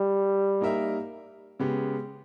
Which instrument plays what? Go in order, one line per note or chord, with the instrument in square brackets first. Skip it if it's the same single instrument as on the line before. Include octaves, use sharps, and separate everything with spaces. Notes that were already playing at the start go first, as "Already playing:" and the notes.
Already playing: [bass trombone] G3
[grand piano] A#3 D#4 A#4 E5
C#3 G#3 B3 G4